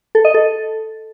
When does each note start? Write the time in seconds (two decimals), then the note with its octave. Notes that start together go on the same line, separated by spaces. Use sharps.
0.15 A4
0.25 D#5
0.34 A4